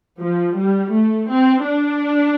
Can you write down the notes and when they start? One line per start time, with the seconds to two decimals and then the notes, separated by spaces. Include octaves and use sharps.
0.22 F3
0.59 G3
0.94 A3
1.30 C4
1.66 D4